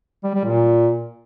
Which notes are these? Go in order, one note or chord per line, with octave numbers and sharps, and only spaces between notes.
G3
G3
A#2